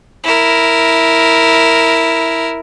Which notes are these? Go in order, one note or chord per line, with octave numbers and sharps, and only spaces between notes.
E4 A#4